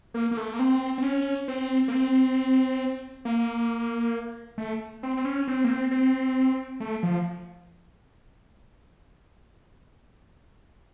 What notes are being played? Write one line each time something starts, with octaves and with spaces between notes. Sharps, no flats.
A#3
A#3
A3
A#3
C4
C4
C#4
C4
A#3
C4
A#3
A3
C4
C4
C#4
C4
A#3
C4
C4
A3
F3